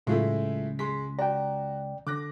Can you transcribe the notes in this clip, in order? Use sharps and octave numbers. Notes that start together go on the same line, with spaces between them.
C#2 A2 F#3 G#3 A3 E4 F4
G#3 C6 B6
F#4 D5 G5 A#5
D3 D6 F#6 A#6